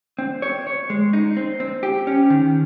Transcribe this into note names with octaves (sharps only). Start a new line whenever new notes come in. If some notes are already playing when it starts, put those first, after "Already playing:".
C4
C#5
C#5
G#3
D#4
C4
C4
G4
C#4
D#3